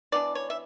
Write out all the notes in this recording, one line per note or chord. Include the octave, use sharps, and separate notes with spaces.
E3 B3 D4 D5
C#5
E5